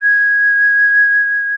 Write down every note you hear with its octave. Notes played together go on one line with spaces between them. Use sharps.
G#6